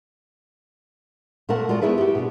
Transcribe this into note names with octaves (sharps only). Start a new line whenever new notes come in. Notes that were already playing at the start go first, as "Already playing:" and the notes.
A#2 A3 A#3 A#4 F#5 A5
G#3 F4 F#4 D5 A5
A3 B3 D4 E4 G#4 B4
F#4 G4
B2 G3 D4